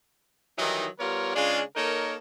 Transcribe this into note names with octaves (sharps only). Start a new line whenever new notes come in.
D#3 E3 F#3 G3 D#4
G3 B3 F4 A#4 C#5
C#3 G#3 D4 F4
A#3 D#4 A4 A#4 C#5